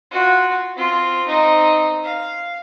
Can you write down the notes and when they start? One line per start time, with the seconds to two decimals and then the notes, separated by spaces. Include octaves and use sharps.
0.11 F4 F#4
0.76 C4 F4
1.27 C4 D#4
2.03 F5